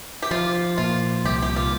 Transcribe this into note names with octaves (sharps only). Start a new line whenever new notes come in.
G4
F3 F4
A#2 F4
C2 G4
G4
F4